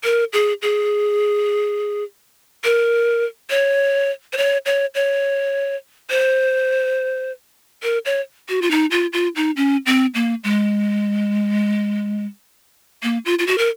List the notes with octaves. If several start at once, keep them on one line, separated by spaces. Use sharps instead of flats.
A#4
G#4
G#4
A#4
C#5
C5
C#5
C#5
C#5
C5
A#4
C#5
F#4
F4
D#4
F4
F4
D#4
C#4
C4
A#3
G#3
A#3
F4
F4
F#4
A#4